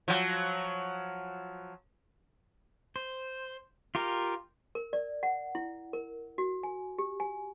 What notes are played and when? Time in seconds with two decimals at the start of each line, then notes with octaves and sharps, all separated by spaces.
0.08 F3 F#3
2.96 C5
3.95 F4 G4 A#4
4.75 A#4
4.93 D5
5.23 F#5
5.55 E4
5.93 A#4
6.38 F#4
6.63 G#5
6.98 G4
7.20 G#5